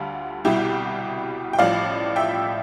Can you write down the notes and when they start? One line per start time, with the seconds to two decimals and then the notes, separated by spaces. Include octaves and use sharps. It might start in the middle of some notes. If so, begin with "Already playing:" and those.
Already playing: D2 D3 G3 F4
0.45 C2 B2 G3 E4 G4
1.53 G5
1.59 A1 A2 F3 D5 F5
2.16 E5 G5